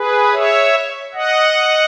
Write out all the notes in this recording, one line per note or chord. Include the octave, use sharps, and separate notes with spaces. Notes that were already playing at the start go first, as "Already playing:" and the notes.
Already playing: G#4 B4
C#5 E5
D#5 F#5